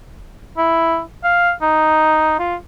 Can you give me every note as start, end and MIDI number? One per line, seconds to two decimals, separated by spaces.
0.58 1.01 64
1.24 1.52 77
1.62 2.36 63
2.39 2.55 65